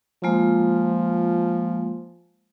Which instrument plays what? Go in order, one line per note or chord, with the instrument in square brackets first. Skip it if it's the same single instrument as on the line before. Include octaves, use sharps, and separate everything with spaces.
[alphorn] F3 [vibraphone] G#3 A#3 F4